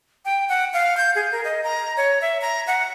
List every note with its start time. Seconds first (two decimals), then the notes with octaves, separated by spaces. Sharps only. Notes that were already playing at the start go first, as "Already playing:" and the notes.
0.25 G5
0.49 F#5
0.74 F5
0.97 G6
1.15 G#4
1.32 A#4
1.44 D#5
1.64 A#5
1.97 C#5
2.22 E5
2.41 A#5
2.67 F#5